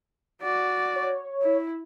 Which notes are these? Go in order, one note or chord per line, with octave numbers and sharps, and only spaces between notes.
F#4 D5
C#5
E4